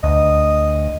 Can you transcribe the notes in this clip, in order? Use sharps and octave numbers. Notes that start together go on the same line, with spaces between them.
D2 D#5